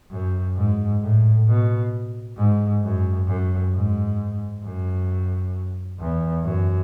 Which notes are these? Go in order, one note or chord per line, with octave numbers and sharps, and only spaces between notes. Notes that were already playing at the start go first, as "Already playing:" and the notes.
F#2
G#2
A2
B2
G#2
F#2
F#2
G#2
F#2
E2
F#2